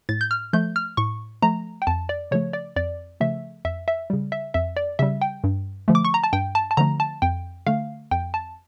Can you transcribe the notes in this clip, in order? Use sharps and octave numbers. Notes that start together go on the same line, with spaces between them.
A2 A6
G6
F6
F3 A3 G6
F6
A2 C#6
F3 A3 A#5
G5
F2 A5
D5
C#3 F3 A3 C#5
D5
F2 D5
C#3 F3 A3 E5
F2 E5
E5
C#3 G3
E5
F2 E5
D5
C#3 G3 E5
G5
G2
D3 F3 A3
D6
C#6
A#5
A5
G2 G5
A5
A5
D3 F3 A3 A#5
A5
F2 G5
D3 A3 F5
F2 G5
A5